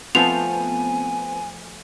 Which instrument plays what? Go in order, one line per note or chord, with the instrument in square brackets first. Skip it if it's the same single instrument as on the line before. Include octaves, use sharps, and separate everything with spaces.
[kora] F3 A3 C5 [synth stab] B3 C4 [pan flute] G#5 [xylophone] F7